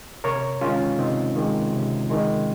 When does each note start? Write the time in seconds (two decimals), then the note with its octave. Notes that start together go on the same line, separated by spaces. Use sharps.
0.24 C3 A#4 C#5
0.61 D#3 G#3 C#4 F4
0.98 C3 C4 D#4
1.36 D#3 G#3
1.73 C3
2.10 D#3 G#3